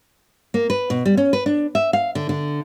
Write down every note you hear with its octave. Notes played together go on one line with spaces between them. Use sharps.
A#3
B4
B2
G3
C#4
B4
D4
E5
F5
D3
D3